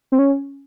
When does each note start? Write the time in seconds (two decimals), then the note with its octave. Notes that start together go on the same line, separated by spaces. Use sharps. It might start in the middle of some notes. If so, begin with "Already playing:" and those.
0.12 C4
0.19 C#4